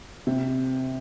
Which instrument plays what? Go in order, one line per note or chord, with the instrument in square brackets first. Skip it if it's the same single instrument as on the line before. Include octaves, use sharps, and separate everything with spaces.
[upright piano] C3